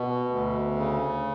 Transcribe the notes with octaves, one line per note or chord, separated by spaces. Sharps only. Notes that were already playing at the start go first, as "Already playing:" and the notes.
Already playing: B2
D2
C#3